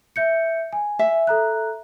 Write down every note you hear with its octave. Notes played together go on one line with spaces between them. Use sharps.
E5 G6 C#7
G#5
E5
A4 A#5 F#6